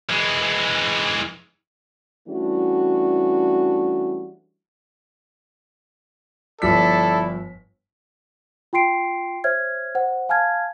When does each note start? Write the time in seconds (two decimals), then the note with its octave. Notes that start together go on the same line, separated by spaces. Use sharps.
0.10 E3 G#3
2.28 E3 G3 A3 C#4 D4 F#4
6.62 G1 F3 E4 A4 D5 B6
8.73 F4 G5 C6 C7 D7
9.44 C5 C#5 E5 F6 G#6
9.95 C5 F#5
10.29 F5 G#5 A5 F6 G#6